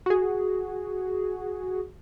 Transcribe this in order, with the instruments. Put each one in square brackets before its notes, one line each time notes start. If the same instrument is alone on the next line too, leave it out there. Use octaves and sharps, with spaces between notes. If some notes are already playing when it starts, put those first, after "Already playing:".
[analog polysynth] F#4 G#4